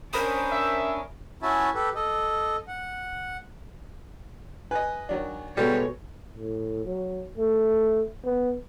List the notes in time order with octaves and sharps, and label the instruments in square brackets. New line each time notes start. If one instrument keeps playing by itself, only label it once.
[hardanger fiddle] C#4 D4 [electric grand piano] A#4 B5 D#6 [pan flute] C5
[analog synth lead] E5
[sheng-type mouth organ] C#4 E4 F#4 E5 G#5 A5
G4 A4 B4
A4 D#5
F#5
[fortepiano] B4 D#5 [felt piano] G#5
[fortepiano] D#3 F#3 D4
[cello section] B2 G#3 C#5 [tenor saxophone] G3 [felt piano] F#4 A4 B4
[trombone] A2
F#3
A3
B3